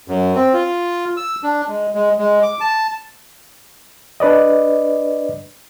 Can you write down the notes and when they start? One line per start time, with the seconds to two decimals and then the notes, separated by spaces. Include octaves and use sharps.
0.08 F#2
0.35 C4
0.54 F4
1.17 E6
1.43 D4
1.68 G#3
1.95 G#3
2.19 G#3
2.43 D6
2.60 A5
4.20 D4 B4 D5 D#5